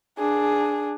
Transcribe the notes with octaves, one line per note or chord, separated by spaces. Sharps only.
D4 G#4